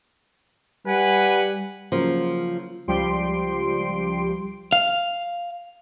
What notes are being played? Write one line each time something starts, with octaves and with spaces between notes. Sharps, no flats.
G3 B4 F#5 G#5
C#3 F3 F#3 A#3
C#2 F3 G3 G4 C6 D7
F5